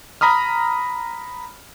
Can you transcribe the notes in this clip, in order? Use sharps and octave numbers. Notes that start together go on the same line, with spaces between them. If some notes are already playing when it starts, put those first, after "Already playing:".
A#5 B5 D#6 F6